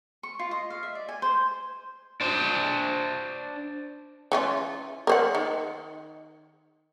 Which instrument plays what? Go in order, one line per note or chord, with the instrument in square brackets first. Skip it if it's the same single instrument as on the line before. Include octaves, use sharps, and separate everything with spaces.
[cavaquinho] C#6
F4
D#5
F5
E5
D5
G#5
C5
[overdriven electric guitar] D4 C5
[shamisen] E3 C#4 F4
A#4 C5 F#5
D#3